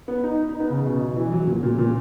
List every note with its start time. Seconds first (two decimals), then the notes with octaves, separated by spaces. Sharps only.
0.08 B3
0.23 D#4
0.49 D#4
0.60 B3
0.70 C#3
0.85 B2
1.01 B2
1.16 E3
1.32 F#3
1.47 A#2
1.63 A#2
1.78 A#2